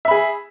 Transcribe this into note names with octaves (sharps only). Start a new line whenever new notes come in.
G#4 E5 B5